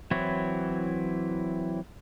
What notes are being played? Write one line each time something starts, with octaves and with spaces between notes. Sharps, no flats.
E3 F#3 C4 E4 C#5